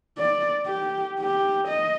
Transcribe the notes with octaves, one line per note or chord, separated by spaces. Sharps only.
D5
G4
G4
D#5